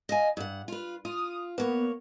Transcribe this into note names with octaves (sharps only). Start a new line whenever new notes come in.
D#5 F5 G#5
G2 F#5
F4 B4
F4 D#6
A#3 B3 C#5